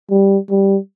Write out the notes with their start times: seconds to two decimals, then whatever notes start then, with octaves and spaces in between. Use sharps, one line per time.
0.10 G3
0.50 G3